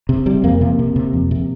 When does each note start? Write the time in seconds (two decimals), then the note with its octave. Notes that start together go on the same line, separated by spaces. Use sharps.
0.09 C3
0.26 C3 G3
0.44 F2 A#3
0.61 C3 A#3
0.79 C3
0.96 C3
1.13 F2
1.31 C3